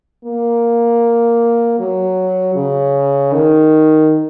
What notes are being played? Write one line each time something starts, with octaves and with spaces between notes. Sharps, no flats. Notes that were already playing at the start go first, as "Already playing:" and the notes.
A#3
F#3
C#3
D#3